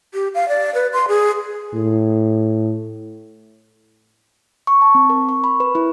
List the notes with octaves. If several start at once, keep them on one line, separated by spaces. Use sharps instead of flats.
G4
F5
D5
B4
C6
G#4
A2
C#6
A5
C4
A#4
C#6
B5
B4
E4